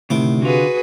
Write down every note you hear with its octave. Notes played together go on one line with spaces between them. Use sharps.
D2 A2 C3 D#3 D6
D3 F4 F#4 G#4 B4